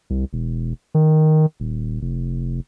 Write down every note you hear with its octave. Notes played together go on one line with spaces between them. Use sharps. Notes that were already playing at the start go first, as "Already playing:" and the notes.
C2
E1
D#3
D#1
F1